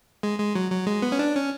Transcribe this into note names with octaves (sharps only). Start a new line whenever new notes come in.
G#3
G#3
F#3
F#3
G#3
B3
C#4
D4
C#4